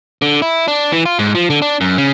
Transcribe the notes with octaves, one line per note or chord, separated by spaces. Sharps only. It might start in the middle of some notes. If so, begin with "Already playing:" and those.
D3
E4
D4
E3
F4
G#2
F3
D3
D4
F#2
C#3